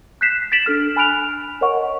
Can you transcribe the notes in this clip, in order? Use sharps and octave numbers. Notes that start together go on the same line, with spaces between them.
F#6 G6 B6 C7 E7
A6 B6 D7 E7 F#7
D4 A4 F6
G#5 B5 F6 F#6 D7 F7
A#4 C#5 D#5 F#5 C#6